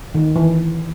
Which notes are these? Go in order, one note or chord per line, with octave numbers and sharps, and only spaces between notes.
D#3
E3